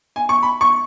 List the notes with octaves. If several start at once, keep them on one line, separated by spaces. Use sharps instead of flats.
G#5
C#6
B5
C#6